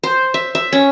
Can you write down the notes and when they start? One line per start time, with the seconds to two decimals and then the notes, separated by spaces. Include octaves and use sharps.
0.03 C5
0.34 E5
0.55 E5
0.73 C#4